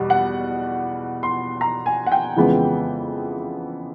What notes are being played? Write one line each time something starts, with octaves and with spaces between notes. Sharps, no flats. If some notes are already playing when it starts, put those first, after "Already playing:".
Already playing: E2 B2 G3
F#5
C6
A#5
G#5
F#5
G5
F2 C#3 E3 G#3 B3